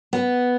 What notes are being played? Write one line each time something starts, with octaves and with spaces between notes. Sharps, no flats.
B3